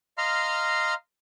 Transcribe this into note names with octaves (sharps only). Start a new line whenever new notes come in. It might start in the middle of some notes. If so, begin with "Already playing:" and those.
D#5 F5 A#5 C6 F6